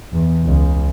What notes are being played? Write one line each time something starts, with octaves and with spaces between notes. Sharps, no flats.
E2
C#2